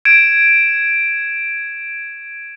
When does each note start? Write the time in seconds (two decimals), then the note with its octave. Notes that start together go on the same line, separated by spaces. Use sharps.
0.05 G#6 D7 E7